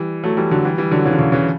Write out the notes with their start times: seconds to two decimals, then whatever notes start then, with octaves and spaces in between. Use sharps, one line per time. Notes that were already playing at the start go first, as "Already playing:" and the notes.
Already playing: E3 G3
0.23 F#3 A3
0.37 E3 G3
0.51 D3 F#3
0.65 E3 G3
0.78 E3 G3
0.91 D3 F#3
1.05 C#3 E3
1.13 D3
1.19 C#3 E3
1.32 C#3 E3